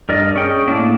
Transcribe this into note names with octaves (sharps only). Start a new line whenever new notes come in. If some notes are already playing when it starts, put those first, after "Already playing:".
G2 A#4 D5 D#5
C#4 G#4 G5
A2 A#3 D4